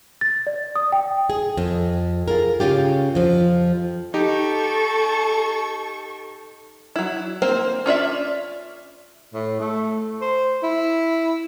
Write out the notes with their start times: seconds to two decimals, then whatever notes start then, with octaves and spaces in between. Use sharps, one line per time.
0.21 A6
0.47 D5
0.76 D#6
0.92 G5
1.30 G#4
1.57 F2
2.28 F4 G#4 A#4
2.60 C#3 C#4 F4 G4
3.15 F2 F3
4.14 D#4 G4 A4 C#6
6.96 F#3 E4
7.42 A#3 C4 C5
7.86 C#4 F4 D5 E5
9.34 A2
9.60 A3
10.21 C5
10.63 E4